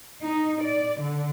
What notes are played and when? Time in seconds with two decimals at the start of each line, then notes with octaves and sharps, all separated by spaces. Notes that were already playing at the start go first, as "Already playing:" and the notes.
0.23 D#4
0.62 D5
1.00 D3